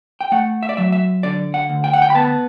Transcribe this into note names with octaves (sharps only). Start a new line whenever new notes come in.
G5
A3 F#5
E5
D5
F#3 E5
E5
D3 D5
F#5
D2
G5
F#5
G5
B5
B3 A5